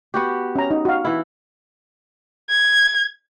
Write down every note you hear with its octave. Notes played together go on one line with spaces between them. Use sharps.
B3 F#4 G4
C#4 A#5
D#4
F#4 F5
E3 E4
G#6